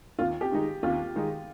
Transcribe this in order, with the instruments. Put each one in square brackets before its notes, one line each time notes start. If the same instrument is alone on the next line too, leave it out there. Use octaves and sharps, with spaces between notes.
[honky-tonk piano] D#2 [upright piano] F4
[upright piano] G4
[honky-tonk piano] D#3 G#3 D#4
[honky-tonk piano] D#2 [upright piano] F4
[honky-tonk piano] D#3 G#3 D#4